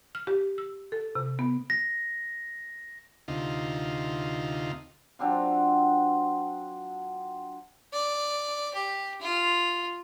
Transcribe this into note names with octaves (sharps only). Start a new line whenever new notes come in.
F6
G4
E6
A4
C3
B3
A#6
D2 C3 D#4 F4
F#3 C4 D4 F4
D5
G4
F4